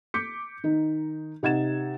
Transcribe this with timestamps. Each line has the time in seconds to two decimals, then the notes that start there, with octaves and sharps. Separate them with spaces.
0.14 D6 G6 B6 C#7
0.64 D#3 D#4
1.43 C3 D#4 F#5 G#6 A6 E7